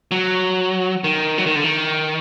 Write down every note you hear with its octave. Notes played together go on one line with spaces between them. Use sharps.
F#3
D#3
F#3
D#3
D3
D#3